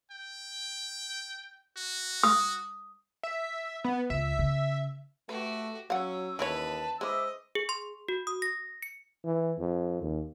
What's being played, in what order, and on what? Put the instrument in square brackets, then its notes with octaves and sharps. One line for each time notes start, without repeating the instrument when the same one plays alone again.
[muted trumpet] G5
F#4
[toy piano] D#6
[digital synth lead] E5
B3
[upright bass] C#2 [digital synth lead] E5
[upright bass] C#3
[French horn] A3 [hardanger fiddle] F#4 G4 [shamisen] B4
[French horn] F#3 [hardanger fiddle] C#4 [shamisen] F5 F#5 [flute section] E6
[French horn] D#2 [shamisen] E3 E4 C#5 [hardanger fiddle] B4 [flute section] A5
[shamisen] G#3 E4 [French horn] C5 [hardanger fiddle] D#5 [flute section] E5 D6 E6
[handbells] G#4
C6
F#4
D#6
A#6
C#7
[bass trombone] E3
F2
D#2